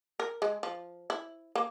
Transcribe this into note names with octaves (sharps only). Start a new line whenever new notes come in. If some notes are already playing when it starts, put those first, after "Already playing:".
A#4
G#3
F3
E4
A#3